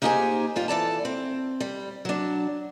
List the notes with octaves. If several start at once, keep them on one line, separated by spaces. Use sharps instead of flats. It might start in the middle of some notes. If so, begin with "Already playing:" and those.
A#3 D#4 G4 G#4 C5 G#5
G#2 G3 F4
E3 A4 D5 A5
C4
G3
F#3 D4